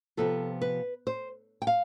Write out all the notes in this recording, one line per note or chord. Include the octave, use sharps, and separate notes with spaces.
C3 F3 B3 F4 A4
B4
C5
G5
F5